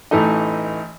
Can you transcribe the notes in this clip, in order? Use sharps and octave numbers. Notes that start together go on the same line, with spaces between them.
A1 E3 A3 D#4 D#5